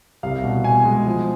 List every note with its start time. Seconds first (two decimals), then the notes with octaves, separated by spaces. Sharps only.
0.23 C2 F5
0.44 B2
0.64 B2 G#5
0.85 G#3
1.06 F3